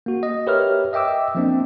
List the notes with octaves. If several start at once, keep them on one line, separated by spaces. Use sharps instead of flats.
A#3 F#4
D#5
G4 A#4 B4 C#5 E5 F6
D#5 E5 G5 D6 E6
F3 A#3 C4 D4